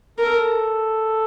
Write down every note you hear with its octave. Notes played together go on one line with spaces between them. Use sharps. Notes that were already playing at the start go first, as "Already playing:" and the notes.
A4 A#4